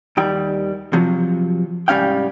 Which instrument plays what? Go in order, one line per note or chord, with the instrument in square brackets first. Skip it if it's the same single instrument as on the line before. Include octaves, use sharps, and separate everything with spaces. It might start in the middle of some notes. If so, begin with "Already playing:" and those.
[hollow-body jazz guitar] D#2 D#3 G3 G5
C3 F3 F#3
C2 G#2 G3 C#4 F5 G5